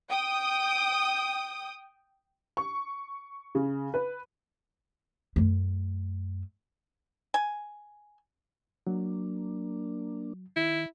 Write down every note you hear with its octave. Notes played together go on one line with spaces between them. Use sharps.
G5 D#6
C#6
C#3
B4
F#2 A3
G#5
F#3 A#3 D4
D#3 E4